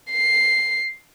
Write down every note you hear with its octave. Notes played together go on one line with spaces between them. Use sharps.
C7